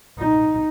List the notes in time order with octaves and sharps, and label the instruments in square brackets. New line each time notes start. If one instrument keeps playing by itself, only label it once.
[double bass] D#4